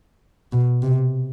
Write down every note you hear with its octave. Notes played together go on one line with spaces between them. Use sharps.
B2
C3